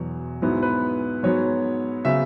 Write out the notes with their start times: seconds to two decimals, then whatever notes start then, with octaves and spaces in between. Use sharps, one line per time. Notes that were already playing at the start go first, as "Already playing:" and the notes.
Already playing: E2 B2 F#3
0.42 G#2 F#3 B3 E4
0.63 B4
1.23 G#2 F#3 B3 C#5
2.05 C#3 F#3 B3 E5